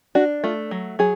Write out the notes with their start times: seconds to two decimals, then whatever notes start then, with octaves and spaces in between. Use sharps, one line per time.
0.15 D4 F#4
0.44 A3 F4
0.71 F#3
0.99 F#3 G#4